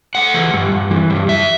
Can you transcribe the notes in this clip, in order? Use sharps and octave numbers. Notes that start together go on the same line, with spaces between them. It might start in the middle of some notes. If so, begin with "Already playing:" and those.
A3 F#5
E3
G2
G2
E3
G2
F#2 E5